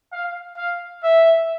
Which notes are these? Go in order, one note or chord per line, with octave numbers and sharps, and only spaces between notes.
F5
F5
E5